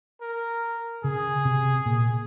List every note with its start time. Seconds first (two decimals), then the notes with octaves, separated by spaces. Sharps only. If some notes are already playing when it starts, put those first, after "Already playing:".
0.21 A#4
1.04 C#3 G#4
1.45 C3
1.86 A#2